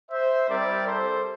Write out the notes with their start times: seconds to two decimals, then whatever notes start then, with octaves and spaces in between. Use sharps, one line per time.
0.11 C5 E5
0.49 G3 C4 E4 G4 A#4 D5
0.87 A4 C5